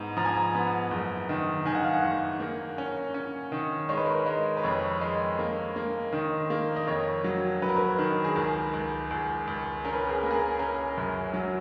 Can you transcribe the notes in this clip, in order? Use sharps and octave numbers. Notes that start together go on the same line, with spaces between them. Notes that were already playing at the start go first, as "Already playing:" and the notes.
Already playing: G#2 B3 A#5
F3 A#5
G#5
A#5
B3
F#1
D#3
D#3 G#5
F#5
F5
F#5
F#1
A#3
C#4
C#4
D#3
G#3 C#5
B4
A#4
B4
G#3
B4
F2 C#5
G#3
A#3
A#3
D#3
A#3
D#5
F2 C#5
F#3
F#3 B4
A#4
B4
D#3
G#4
C#2 A#4
C#2
C#2
C#2
C#4 A#4
B4
A#4
G#4
A#3
G#4
A#4
C#4 A#4
F#2
F#3